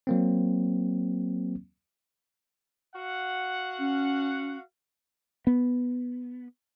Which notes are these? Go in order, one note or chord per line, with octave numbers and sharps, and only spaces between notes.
F#3 A#3 C4
F#4 F5 F#5
C#4
B3